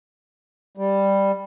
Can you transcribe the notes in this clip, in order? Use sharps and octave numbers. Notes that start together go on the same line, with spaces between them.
G3